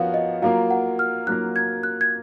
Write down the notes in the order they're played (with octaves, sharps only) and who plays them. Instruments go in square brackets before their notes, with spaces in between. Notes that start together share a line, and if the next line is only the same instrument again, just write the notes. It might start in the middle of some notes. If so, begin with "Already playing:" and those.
Already playing: [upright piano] F3 B3 F#4 A#4 C#5 [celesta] F5
[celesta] D#5
[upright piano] F#3 A#3 F4 A#4 [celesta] F5
[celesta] F#5
F6
[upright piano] F#3 A#3 F4 A#4 [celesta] F#6
[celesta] G#6
F#6
G#6